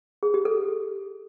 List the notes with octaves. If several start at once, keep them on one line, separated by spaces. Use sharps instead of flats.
G#4
G4
A4